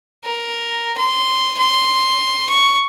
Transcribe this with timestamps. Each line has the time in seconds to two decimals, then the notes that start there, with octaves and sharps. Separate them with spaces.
0.25 A#4
0.98 C6
1.59 C6
2.49 C#6